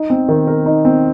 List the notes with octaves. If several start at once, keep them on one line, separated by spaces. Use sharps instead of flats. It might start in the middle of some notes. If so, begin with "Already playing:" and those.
Already playing: D#4
C4
D#3
A#4
D#4
C4